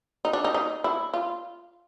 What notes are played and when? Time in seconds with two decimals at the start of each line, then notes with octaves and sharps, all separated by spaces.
0.25 D#4
0.33 D4
0.44 D#4
0.54 D#4
0.84 E4
1.14 F4